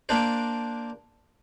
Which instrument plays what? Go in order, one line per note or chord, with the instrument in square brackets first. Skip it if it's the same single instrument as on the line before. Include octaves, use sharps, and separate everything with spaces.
[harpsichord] A#3 D4 C5